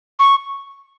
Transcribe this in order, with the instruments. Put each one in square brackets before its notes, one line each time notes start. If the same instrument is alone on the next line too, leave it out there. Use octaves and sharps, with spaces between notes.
[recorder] C#6